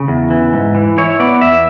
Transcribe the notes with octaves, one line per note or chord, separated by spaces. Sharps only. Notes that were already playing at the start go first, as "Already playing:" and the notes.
Already playing: C#3
E2
E3
G#2
E3
E4 C#5
B3 D5
E2 E5